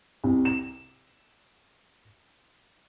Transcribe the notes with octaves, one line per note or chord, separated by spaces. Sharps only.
C2
E7